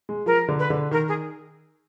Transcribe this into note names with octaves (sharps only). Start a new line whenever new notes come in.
G#3
F3 A#4
D3
B4
D3
D#3 A#4
G#4